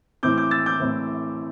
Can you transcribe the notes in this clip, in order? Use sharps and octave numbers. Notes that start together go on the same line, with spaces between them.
A2 E3 C4 D6 G6
D6 G6
E6 A6
D6 G6
A2 E3 C4